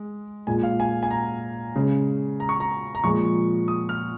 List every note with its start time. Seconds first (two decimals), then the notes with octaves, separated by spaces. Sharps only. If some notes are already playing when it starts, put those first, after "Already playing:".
Already playing: G#3
0.47 A#2 G#3 G#5
0.63 F5
0.80 G#5
1.03 G#5
1.11 A#5
1.76 C#3 G#3
2.40 A#5
2.49 C#6
2.60 A#5
2.95 A#5
3.04 A#2 F3 G#3 C#6
3.68 D#6
3.89 F6